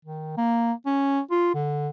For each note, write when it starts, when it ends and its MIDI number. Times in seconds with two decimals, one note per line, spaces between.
0.05 0.36 51
0.37 0.72 58
0.86 1.20 61
1.30 1.53 65
1.54 1.89 50